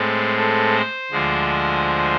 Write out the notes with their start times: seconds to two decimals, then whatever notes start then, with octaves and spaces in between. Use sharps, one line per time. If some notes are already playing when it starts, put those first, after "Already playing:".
Already playing: A2 G#3 C4 A4
0.38 A4
0.75 C5
1.11 D2 D3 F3 G#3